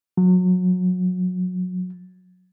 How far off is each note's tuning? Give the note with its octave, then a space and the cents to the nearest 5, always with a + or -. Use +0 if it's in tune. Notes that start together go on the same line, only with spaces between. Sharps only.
F#3 -25